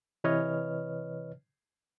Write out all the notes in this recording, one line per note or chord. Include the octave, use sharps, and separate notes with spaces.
C3 E3 B4 C#5 D#5 F6